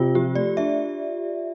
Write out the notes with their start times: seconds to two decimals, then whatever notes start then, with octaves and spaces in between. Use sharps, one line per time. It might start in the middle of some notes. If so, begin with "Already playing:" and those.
Already playing: C3 F4
0.15 F3 G4
0.35 A3 D5
0.57 D4 E5